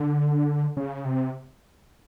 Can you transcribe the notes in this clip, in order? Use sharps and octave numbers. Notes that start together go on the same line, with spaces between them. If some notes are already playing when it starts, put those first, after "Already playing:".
Already playing: D3
C#3
C3